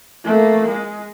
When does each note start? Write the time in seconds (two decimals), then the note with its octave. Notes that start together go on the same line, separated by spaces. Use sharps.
0.25 A3 A#3
0.69 G#3